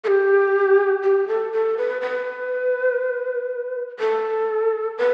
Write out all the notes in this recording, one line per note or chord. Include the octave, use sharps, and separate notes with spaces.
A4
G4
G4
A4
A4
B4
B4
A4
B4